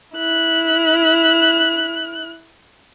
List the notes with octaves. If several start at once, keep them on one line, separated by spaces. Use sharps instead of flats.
E4 F#6